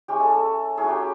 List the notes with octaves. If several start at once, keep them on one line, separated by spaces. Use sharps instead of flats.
G#3 C#4 E4 G4
A4
A4
F#3 A3 C#4 E4 G#4
G4